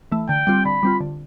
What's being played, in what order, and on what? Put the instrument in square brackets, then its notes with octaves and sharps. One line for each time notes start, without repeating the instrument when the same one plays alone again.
[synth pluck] E3 A3
[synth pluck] D3 [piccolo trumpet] G5
[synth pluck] G3 C4 F4
[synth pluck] D3 [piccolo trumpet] B5
[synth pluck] G3 C4 F4
D3